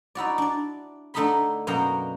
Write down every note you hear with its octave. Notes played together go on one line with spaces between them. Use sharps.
D#4 E4 F#4 D5
D4 D5
D3 A3 D#4 D#5 B5 C6
F#2 B2 A#3 F#4 G5 A#5